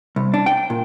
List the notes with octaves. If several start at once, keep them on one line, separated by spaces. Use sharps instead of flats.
C2
D4
G5
A#2